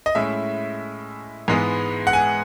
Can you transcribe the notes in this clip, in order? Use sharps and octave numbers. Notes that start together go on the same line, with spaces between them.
D#5
A2 G#3 C#4 E4 E5
G#2 E3 G#3 B3
F#5
G#5